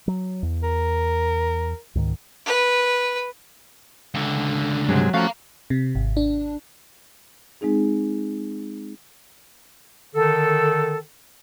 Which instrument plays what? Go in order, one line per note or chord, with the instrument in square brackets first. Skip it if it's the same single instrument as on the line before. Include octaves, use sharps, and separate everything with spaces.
[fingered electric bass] F#3
E2
[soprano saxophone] A#4
[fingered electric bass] C#2 G#2 D#3
[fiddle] B4
[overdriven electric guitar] C#2 D3
[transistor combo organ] G2 C3 G#3 [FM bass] F#3
[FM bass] F3 [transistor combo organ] A3 C#4 F#4 [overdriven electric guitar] F5 A#5
[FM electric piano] C3
G#1
D4
[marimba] G#3 C4 D#4 G#4
[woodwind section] D3 D#3 A4